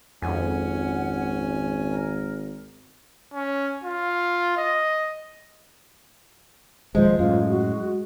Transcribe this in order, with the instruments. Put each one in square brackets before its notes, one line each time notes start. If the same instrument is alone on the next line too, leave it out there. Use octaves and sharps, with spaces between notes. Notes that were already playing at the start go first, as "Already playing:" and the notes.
[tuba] G#1 [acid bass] F2 [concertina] C#4 G#5 [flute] F#5
[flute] A#4
[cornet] C#4
F4
D#5
[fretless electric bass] D#1 F3 [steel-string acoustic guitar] G#3 [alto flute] C5
[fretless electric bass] F#2 A2 [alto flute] F4
[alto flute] F#4